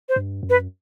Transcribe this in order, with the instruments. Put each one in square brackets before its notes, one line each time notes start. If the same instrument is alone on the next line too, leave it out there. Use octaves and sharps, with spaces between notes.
[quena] C5
[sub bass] G2
F#2
[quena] B4